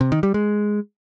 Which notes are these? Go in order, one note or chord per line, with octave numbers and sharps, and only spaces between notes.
C3
D#3
G3
G#3